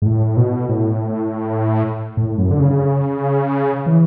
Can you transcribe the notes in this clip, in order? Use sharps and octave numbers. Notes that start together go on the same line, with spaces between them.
G#2
A2
B2
A2
A2
F#2
D3
C#3
E3